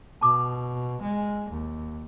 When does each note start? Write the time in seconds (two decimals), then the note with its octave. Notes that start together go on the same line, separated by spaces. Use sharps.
0.21 B2 A5 D6 D#6
1.01 G#3
1.50 D#2